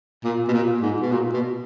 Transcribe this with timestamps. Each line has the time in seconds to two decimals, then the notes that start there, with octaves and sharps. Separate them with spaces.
0.24 A#2
0.48 B2
0.53 A#2
0.82 G#2
1.02 B2
1.12 A#2
1.34 B2